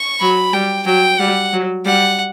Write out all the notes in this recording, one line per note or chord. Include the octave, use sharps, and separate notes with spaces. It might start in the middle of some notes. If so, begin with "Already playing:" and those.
Already playing: C#6
F#3 B5
G3 G5
F#3 G5
G3 F#5
F#3
G3 F#5